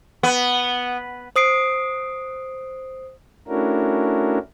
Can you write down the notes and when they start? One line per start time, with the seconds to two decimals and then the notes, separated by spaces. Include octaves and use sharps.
0.23 B3
1.36 C5 D#6 C7 D7
3.48 A3 C#4 D4 E4 F#4 A#4